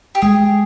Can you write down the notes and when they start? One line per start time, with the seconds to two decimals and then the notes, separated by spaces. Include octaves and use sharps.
0.15 G4
0.22 G#3 G#4